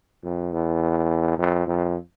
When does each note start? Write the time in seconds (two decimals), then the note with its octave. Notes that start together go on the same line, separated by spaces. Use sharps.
0.24 F2
0.52 E2
1.38 F2
1.67 F2